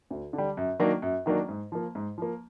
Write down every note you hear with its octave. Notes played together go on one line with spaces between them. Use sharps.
D2
D3
G3
F#2
D#3 F#3 A#3 D4
F#2
D#3 F#3 A#3 D4
G#2
F3 A#3
G#2
F3 A#3